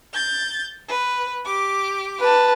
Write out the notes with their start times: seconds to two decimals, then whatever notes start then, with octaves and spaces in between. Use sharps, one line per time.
0.13 G6 A6
0.89 B4
1.46 G4 D6
2.19 B4 A5